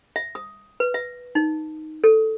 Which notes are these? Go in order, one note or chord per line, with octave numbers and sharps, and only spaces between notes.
E5
D#6
B4
E5
D#4
A4